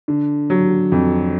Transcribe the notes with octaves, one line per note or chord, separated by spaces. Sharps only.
D3
F#3
F2